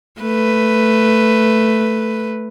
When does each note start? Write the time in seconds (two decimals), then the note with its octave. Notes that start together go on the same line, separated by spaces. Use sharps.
0.21 A3 B4